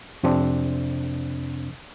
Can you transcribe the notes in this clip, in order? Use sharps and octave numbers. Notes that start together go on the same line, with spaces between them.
F2 C3 C4 D4